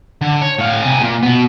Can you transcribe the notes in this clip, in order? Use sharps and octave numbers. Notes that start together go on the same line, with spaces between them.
D3
C#5
A2 F5
C3 G#4
A#2
B2 B3